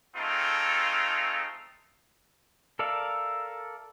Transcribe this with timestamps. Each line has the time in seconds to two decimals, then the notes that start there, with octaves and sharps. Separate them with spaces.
0.16 A3 C4 D#4 F4 G#4 A4
2.79 A4 A#4 D5 E5 F5